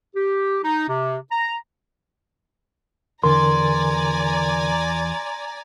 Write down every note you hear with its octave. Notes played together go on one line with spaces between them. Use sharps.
G4
D#4
C3
A#5
E2 D3 A#4 D5 G#5 A#5 C6